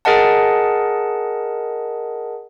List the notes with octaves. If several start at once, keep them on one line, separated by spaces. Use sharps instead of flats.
G#4 A#4 D#5 F#5 A5